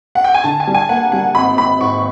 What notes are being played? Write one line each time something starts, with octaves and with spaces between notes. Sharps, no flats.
F#5
G5
G#5
D3 A5
G#5
G3
G#5
A#3 F#5
G3 F#5
G#1 B5
G#1 B5
G#2 C#6